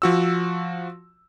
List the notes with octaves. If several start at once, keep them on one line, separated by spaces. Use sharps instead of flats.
F3 F#4 E6